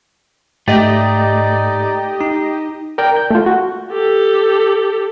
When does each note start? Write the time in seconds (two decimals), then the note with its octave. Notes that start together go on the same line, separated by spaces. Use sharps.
0.68 G#2 A3 D#4 G4 D5 D#5
2.21 D#4
2.98 A#4 D5 G5
3.17 G6
3.31 A3 F4
3.46 F#4
3.91 G4 A4